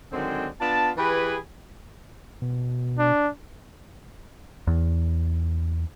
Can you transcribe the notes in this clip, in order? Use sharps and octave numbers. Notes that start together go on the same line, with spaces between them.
D3 D#3 F#3 G#3 C4
B3 D4 F4 A5
E3 G4 G#4 B4
B2
D4
E2